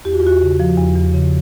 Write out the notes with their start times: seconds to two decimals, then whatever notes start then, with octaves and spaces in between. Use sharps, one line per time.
0.05 E2 G4
0.13 F#4
0.20 F4
0.24 E2 F#4
0.42 C#3
0.60 F3
0.77 E2
0.95 E2
1.14 C#3